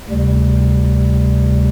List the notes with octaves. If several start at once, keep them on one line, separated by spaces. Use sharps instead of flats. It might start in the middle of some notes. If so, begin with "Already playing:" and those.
D2 C3 G3